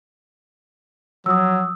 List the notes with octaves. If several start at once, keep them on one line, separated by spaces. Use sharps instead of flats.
F3 F#3 D#6 E6